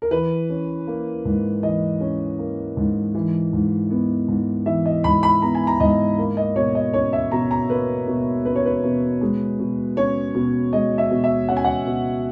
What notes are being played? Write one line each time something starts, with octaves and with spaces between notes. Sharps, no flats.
A#4
E3 B4
C#4
A#3
G#2
E3 D#5
C#4
A#3
G#2
E3
G#2
B3
G#2
E3 E5
D#5
G#2 B5
B5
B3 A#5
G#5
A#5
G#2 D#5
A#3
D#5
B2 C#5
D#5
C#4 C#5
E5
B2 A#5
A#5
A#3 B4
B2
C#4 B4
C#5
B4
B2
G#3
B2
C#4 C#5
B2
G#3 D#5
E5
B2
E5
C#4 F#5
G#5
F#5
B2